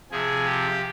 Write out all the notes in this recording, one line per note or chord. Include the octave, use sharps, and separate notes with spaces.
C3 F3 G#4
G4